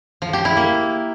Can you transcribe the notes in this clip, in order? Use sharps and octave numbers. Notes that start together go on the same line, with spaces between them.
F3
G4
E4
A#3